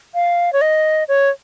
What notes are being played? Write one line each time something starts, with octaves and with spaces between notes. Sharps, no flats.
F5
C#5
D#5
C#5